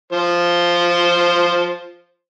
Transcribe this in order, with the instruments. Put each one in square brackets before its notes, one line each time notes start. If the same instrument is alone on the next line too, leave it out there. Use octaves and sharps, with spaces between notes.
[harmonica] F3 C5